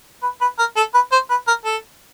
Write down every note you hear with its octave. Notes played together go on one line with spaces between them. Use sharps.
B4
B4
A#4
A4
B4
C5
B4
A#4
A4